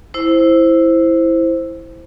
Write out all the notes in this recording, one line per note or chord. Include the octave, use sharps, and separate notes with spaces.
E4 C5